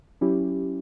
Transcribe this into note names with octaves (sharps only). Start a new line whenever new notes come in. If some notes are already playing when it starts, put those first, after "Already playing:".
F#3 C#4 E4 G4